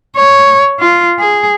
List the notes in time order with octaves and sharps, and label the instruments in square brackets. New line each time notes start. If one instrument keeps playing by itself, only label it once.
[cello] C#5
F4
G#4